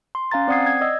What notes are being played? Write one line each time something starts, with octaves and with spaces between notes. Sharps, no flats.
C6
C#4 F5 G#5 A#5 A6
C4 D5 F#5 D#6 G#6 C7
G#6
D5 D#5 E6